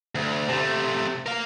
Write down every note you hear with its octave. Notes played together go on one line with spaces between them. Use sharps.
D2
C3 A3
A#4 F5